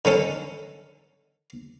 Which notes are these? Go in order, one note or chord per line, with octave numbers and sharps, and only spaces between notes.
D3 D#3 C#4 A4